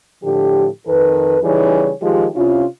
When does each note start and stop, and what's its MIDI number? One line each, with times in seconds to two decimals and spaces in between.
0.23 0.66 45
0.23 0.66 50
0.23 0.66 53
0.23 0.66 67
0.87 1.37 41
0.87 1.37 51
0.87 1.37 69
0.87 1.37 71
1.43 1.91 49
1.43 1.91 52
1.43 1.91 55
1.43 1.91 63
1.43 1.91 68
1.43 1.91 73
2.01 2.26 51
2.01 2.26 53
2.01 2.26 56
2.01 2.26 65
2.01 2.26 67
2.34 2.65 48
2.34 2.65 61
2.34 2.65 64
2.34 2.65 65